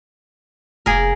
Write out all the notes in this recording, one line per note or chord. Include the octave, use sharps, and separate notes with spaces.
F1 A#3 G#4 A#4